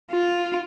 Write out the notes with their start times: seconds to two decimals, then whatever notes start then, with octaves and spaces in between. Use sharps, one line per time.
0.11 F4